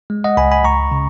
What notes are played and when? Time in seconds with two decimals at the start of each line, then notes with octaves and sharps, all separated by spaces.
0.10 G#3
0.24 D#5 F#5
0.37 C#2 G#5 B5
0.51 G#5 B5
0.64 C#2 A#5 C#6
0.91 C#3